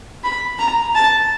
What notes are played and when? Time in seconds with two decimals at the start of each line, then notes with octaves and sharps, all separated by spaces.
0.24 B5
0.59 A#5
0.95 A5